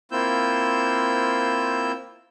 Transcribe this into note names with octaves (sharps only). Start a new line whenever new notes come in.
A#3 C4 E4 F4 E6 G6